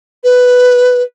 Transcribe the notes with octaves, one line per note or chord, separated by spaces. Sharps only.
B4